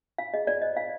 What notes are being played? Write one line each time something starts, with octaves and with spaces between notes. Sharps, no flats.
F4 F5
G#4 D#5
F4 D5
C5 D#5
F4 F5